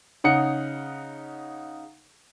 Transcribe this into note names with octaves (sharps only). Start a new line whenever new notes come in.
C#3 D#4 F#5 C#7